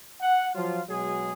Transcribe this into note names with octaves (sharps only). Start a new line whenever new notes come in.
F#5
F3 F#3 F4
B2 F#3 G#3 G#4